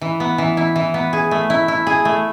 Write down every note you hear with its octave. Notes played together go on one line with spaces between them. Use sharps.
E3
B3
E3
E4
E3
B3
G#4
A3
E4
E4
G#4
A3